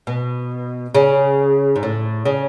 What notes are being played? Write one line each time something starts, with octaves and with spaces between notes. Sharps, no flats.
B2
C#3
G#2
A2
C#3